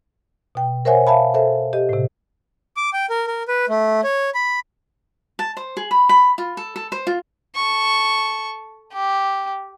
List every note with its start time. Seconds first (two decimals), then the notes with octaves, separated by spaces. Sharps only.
0.55 B2 G5
0.85 A#4 C5 C#5 E5 F#5 G#5
1.07 E5 F5 A5 B5
1.34 A4 C5 E5
1.73 G4 D#5
1.89 A2 C3
2.77 D6
2.93 G5
3.10 A#4
3.27 A#4
3.48 B4
3.69 A3
4.04 C#5
4.34 B5
5.39 A5
5.57 C5
5.77 G#4
5.91 B5
6.09 B5
6.38 F4
6.57 A4
6.76 A4
6.92 C5
7.07 F4
7.56 A4 C#6
8.93 G4